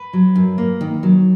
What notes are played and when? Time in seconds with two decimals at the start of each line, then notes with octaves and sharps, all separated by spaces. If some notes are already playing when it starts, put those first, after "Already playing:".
Already playing: B4
0.13 F#3
0.35 F#2
0.58 A#3
0.81 D#3
1.03 F#3